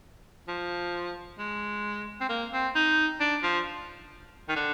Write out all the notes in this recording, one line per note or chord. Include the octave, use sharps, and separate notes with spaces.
F3
G#3
C4
A#3
C4
D#4
D4
F3
D#3
D3